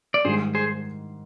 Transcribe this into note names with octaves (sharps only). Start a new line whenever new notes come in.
D5
G#2 D#3 G3 G#4 C5
G#4 C5